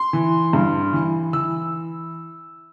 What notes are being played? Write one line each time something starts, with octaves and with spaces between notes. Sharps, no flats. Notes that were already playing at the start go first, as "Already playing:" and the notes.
Already playing: C6
E3
G2
E3
E3 E6